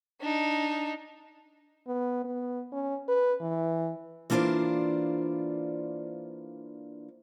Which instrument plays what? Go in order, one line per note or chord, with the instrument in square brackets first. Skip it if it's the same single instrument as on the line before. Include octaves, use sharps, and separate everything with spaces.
[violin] D4 D#4
[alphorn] B3
B3
C#4
B4
E3
[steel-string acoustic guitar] E3 A#3 D4 F4 C5 D5